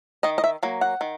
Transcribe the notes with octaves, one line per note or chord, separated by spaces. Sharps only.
D#3 D#5
D#5
E5
F#3 A#3
F#5
D#3